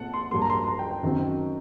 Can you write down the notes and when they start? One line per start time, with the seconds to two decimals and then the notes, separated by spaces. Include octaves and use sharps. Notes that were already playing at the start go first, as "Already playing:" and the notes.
Already playing: A#2 A3 C4 F#5 A5
0.13 C6
0.31 G2 F#3 A#3 C6
0.42 A#5
0.50 C6
0.64 C6
0.68 A#5
0.79 G5
0.91 G5
1.03 F#2 D#3 F#3 C4